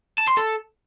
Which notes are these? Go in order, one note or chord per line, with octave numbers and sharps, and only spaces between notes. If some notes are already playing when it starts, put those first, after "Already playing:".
A5
C6
A4